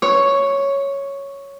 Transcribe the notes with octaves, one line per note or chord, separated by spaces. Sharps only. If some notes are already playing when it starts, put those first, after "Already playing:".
C#5